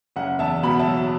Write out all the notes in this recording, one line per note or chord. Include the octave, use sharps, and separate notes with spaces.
F#1 F#5
E2 E5 A5
B2 F#5 B5
E5 A5
F#3